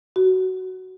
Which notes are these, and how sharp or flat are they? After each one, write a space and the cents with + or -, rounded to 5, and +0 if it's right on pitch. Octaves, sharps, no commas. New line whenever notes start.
F#4 +10